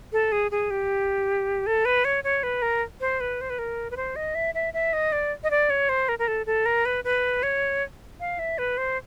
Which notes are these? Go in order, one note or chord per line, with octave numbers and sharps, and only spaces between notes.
A4
G#4
G#4
G4
A4
B4
C#5
C#5
B4
A#4
C5
B4
C5
B4
A#4
B4
C5
D#5
E5
E5
E5
D#5
D5
D#5
D5
C#5
C5
A#4
A#4
A4
A4
A#4
B4
B4
C#5
F5
E5
B4
C5